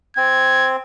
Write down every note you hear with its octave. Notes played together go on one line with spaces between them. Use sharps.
C4 G#6